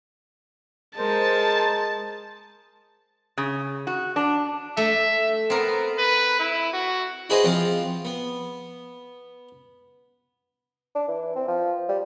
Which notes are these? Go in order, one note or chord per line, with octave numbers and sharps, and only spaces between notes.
G#3 A#4 C5 A5
C#3
F#4
D4
A3 E5
B3 C4 A#4
B4
E4
F#4
E4 F#4 G#4 B4 C5 D#5
F3 C4 F4
B3
D4
E3
C4
F3
G3